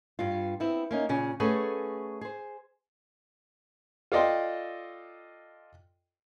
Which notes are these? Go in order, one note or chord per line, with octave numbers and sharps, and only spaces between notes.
G2 F4
B3 C4 E4
A#3 C#4 D#4
A#2 C#3 C#4
A3 C#4 G#4 A4 B4 F#5
G#4 C5
F4 A4 D5 D#5 G5 C6